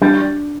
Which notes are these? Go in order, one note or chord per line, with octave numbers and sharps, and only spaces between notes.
G3 D4